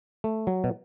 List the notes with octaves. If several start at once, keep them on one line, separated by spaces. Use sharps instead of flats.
A3
F#3
B2